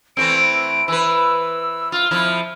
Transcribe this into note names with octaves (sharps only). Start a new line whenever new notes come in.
E3 A3 C4 D7
E3 B4 E6
F4 F6
F2 F3 E4